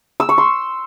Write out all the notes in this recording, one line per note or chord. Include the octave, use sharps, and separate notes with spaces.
E6
C#6
C6